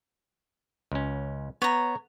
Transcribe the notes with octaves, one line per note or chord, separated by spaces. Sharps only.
C#2 C#4
B3 C#5 A#5